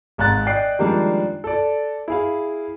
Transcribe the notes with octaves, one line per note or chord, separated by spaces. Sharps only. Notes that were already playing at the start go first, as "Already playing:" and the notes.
G#1 G#2 F5 F#6 A6
D5 D#5 G5 F#6 C7
D#3 F3 G3 G#3 A#3 D4
A4 D5
E4 G#4 F5